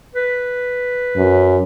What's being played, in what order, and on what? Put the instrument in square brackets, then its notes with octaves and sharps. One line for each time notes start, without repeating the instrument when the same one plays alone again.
[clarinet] B4
[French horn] F#2